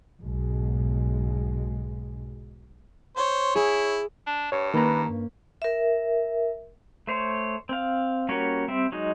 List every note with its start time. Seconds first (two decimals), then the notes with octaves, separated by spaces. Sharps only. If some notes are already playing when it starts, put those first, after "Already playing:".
0.22 B1 G#2 B2 G#3
3.17 C5 C#5
3.55 E4 G#4
4.26 D4
4.52 G2 C#5
4.74 D#3 A#3 C#4 B4 A#5
5.07 G2
5.62 A#4 E5
7.07 A3 C5 C#5
7.69 C4 F5
8.29 G3 A#3 C#4 F#4 C#5
8.68 G3 C4 E5
8.92 F#3 G#3 D#4